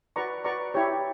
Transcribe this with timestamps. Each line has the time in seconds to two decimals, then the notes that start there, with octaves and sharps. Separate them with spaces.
0.16 F#4 B4 D5 A#5 C#6
0.44 F#4 B4 D5 A#5 C#6
0.74 E4 G4 C#5